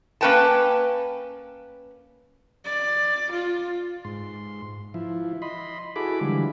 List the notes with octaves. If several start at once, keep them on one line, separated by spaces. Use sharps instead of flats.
A#3 C#4 B4 G5 A5
D5
F4
G#2 C6
F3 E4
D#5 B5 C6
E4 F#4 G#4 A4 B5 D6
D3 E3 F3 G3 G#3